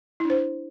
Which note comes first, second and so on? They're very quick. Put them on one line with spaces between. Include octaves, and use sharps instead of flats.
E4 D4 C5